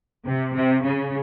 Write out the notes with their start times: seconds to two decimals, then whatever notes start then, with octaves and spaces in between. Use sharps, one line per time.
0.25 C3
0.54 C3
0.83 C#3